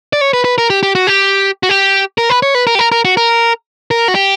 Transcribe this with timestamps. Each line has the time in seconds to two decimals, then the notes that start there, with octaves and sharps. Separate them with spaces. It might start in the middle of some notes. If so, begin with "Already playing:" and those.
0.13 D5
0.21 C#5
0.33 B4
0.45 B4
0.58 A#4
0.70 G4
0.83 G4
0.95 F#4
1.07 G4
1.63 F#4
1.69 G4
2.18 A#4
2.30 B4
2.43 C#5
2.55 B4
2.67 A#4
2.75 G4
2.79 A#4
2.92 A#4
3.05 F#4
3.17 A#4
3.91 A#4
4.08 F#4
4.15 G4